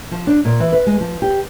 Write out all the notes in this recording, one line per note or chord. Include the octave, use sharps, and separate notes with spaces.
F3
D4
A#2
E3
B4
G#3
F3
G4